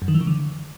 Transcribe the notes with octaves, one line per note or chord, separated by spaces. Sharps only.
F#2
D#3
E3
C#3
D3